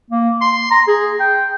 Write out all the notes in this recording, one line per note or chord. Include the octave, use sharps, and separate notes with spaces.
A#3
C6
A#5
G#4
G5